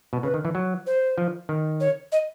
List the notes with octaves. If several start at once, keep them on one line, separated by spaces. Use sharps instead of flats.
B2
C#3 B4
D#3
E3
F#3
C5
F3
D#3
C#5
D#5